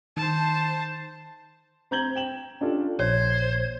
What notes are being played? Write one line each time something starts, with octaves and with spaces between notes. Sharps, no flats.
D#3 C5 A5
C4 A#5 G6 G#6 F#7 G7
G5 E7 F#7
C#4 D4 F4 G4 A4 D5
A#1 C5 C#5 G#6